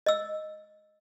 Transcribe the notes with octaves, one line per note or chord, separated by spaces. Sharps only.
D#5 E6